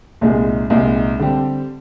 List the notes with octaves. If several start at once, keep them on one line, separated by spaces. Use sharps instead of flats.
C2 A#2 G#3 D#4 G#4
C2 A#2 G#3 D#4 G#4
D3 G3 C4 G4